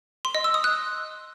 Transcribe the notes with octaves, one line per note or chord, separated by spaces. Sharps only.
C6
D#5
E6
D#6
F#6